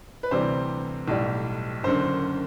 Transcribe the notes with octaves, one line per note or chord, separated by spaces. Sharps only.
B4
D2 C3 E3 G3 C5
B1 A2 G3
F#1 F#2 D3 C5